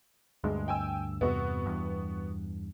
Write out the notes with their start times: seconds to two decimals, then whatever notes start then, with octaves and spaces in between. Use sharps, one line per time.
0.44 D2 G2 G#3
0.68 G5 G#5 E6
1.21 E2 G2 C3 B3 F#4
1.66 E2 G2